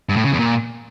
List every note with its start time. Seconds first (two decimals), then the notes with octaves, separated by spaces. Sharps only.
0.09 G2
0.17 A2
0.24 C#3
0.32 E2
0.39 A#2